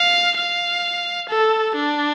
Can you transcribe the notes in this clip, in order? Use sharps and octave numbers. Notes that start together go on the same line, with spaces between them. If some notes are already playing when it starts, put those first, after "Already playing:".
Already playing: F5
F5
A4
D4